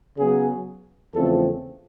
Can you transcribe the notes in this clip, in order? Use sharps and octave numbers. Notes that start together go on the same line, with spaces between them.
C#3 F#3 B3 G#4
E2 C#3 F3 A3 C4 A4